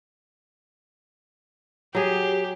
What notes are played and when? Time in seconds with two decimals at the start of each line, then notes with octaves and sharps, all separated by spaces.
1.95 F#3 G4 G#4